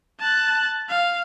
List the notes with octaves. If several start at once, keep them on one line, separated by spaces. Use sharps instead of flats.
A5 F#6
F5